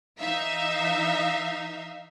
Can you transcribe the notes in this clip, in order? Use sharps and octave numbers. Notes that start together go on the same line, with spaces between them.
E3 D#4 E5 F5